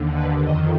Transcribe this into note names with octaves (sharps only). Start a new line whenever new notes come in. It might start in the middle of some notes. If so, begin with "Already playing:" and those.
Already playing: D#2 D3
B4
F2 D#3 D#5